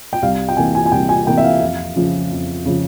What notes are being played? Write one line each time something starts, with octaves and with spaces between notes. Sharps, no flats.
G5
C2 F5
G5
C3 E3 A#3 G#5
G#5
G#5
C2 G5
G#5
C3 E3 A#3 G5
E5
F5
F2
C#3 F3
F2
C#3 F3